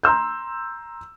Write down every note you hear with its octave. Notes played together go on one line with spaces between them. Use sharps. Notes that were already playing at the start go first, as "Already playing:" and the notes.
A#5 C6 E6 G6